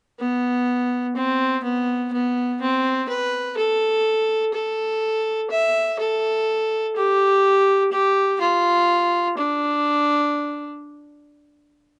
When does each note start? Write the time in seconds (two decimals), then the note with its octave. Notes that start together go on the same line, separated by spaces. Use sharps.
0.19 B3
1.16 C4
1.64 B3
2.13 B3
2.61 C4
3.09 B4
3.57 A4
4.54 A4
5.51 E5
5.99 A4
6.96 G4
7.92 G4
8.41 F4
9.37 D4